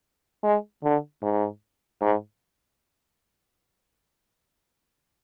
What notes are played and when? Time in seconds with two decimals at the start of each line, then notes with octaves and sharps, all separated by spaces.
0.44 G#3
0.84 D3
1.22 G#2
2.01 G#2